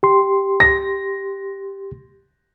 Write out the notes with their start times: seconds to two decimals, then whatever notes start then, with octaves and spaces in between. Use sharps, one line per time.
0.03 G4 C6
0.60 A#6